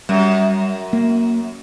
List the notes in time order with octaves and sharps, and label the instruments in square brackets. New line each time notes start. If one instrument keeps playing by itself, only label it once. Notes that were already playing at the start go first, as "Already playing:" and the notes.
[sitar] F#2 [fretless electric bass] G3
[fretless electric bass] A#3